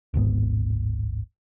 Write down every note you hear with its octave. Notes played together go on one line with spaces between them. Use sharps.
D1 G#1 G#2 B3